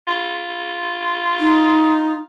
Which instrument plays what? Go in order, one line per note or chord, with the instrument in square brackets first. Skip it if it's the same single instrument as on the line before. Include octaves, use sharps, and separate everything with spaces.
[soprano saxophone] F4
[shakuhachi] D#4